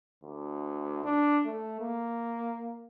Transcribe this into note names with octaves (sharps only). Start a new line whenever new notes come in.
D2
D4
A3
A#3